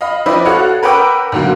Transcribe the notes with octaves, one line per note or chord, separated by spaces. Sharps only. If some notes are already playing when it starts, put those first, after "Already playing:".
D#5 F5 B5
F3 C4 E4 B4 D5 D#5
F#4 A4 C#5 F5 F#5
A#4 B4 F#5 G5 D6 E6
G#2 D3 F#3 A#3